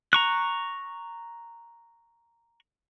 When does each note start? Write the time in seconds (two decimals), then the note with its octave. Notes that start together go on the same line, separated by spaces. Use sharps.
0.13 A#5 C#6 F#6